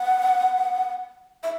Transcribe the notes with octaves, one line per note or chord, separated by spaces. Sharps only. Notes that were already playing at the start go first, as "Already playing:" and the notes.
Already playing: F#5
E5